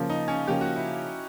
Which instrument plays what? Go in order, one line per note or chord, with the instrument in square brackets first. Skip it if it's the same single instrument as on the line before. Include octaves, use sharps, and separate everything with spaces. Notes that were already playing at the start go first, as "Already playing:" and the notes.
Already playing: [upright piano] C#3 F3 A#3
[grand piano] D#4
C#4
[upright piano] C#3 F3 A#3 [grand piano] G4
[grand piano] F#4
E4